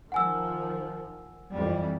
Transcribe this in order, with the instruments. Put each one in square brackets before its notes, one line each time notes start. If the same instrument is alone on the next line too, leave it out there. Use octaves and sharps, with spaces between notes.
[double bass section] D#3 F3 [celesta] F#5 G#5 E6
[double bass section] F2 E3 G3